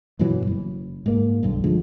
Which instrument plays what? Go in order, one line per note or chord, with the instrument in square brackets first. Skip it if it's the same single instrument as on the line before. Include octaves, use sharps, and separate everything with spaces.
[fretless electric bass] G2 B2 E3 F#3
F#1
G#2 A#3
B1 G2 D3
D3 F3 G#3